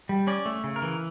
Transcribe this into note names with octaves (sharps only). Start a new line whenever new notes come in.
G3
C#4 D5
A3
C#3
A#4
E3